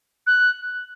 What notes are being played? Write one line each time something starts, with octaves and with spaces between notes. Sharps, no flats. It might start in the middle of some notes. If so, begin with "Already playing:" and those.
F#6